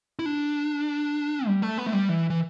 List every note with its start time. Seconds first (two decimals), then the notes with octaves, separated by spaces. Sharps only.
0.19 E4
0.26 D4
1.47 G3
1.62 A3
1.78 B3
1.87 A3
1.93 G3
2.09 E3
2.30 E3